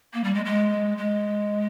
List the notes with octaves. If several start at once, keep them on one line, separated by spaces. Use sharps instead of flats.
A#3
G3
G#3
G#3
G#3